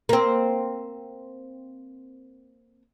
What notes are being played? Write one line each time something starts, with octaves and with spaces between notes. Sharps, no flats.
A#3 C4